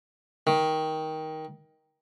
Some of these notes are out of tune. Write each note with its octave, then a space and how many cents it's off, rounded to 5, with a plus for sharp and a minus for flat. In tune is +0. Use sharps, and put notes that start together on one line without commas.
D#3 +15